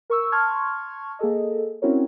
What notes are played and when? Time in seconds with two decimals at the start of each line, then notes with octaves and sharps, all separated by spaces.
0.10 A#4 C#6 E6
0.32 A5 C6 C#6 F6 G#6
1.19 A#3 G#4 A4 D#5
1.82 C4 C#4 E4 F#4 A#4 C#5